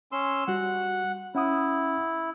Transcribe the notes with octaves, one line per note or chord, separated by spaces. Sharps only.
C#4 C6 E6
G3 F#4 F#5
C#4 E4 F#5 D#6